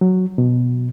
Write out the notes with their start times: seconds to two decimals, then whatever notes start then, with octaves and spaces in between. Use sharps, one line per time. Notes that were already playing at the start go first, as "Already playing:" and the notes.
0.01 F#3
0.38 B2